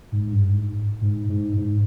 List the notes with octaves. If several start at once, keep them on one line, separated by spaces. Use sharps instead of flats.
G#2
G2
G#2
G#2
G#2
G#2